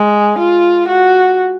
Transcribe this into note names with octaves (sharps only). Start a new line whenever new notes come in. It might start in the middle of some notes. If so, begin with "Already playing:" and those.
Already playing: G#3
F4
F#4